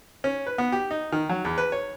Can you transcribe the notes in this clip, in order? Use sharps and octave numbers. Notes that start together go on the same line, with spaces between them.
C#4
B4
B3
G4
D#4
D#3
F#3
E2
B4
C#5